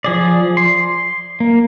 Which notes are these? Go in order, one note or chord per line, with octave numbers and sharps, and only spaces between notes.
F3 G#4 D5
C6
A#3